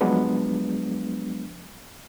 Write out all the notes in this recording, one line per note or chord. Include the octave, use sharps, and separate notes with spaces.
F3 F#3 G#3 B3 D4